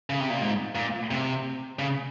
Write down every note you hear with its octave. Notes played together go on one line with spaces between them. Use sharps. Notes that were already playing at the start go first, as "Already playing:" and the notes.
C#3
C3
A#2
G#2
A#2
C3
C#3